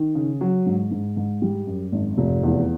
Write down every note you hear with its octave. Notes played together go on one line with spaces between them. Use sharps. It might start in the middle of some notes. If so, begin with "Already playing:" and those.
Already playing: D#3
C#3
F#3
G#2
G#2
G#2
G3
F#2
G#1
F1
E2